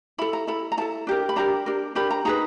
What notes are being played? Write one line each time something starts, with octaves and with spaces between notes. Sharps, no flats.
E4 A4 B5
A#5
E4 A4 B5
A#5
E4 A4 A5
D4 G4 A#4
B5
D4 G4 A#4 A#5
D4 G4 A#4
D4 G4 A#4 B5
A#5
D#4 G#4 B4 A#5